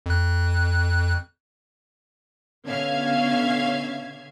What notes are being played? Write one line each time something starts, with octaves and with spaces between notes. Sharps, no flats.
F2 F#6
B2 D3 C#4 E5 F5 G#6